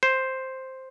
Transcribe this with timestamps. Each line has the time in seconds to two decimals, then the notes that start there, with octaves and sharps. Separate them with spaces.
0.03 C5